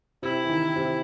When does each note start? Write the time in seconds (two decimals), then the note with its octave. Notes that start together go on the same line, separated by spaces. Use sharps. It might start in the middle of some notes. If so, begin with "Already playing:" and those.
0.22 C3 E4
0.44 E3
0.49 D#3
0.76 C3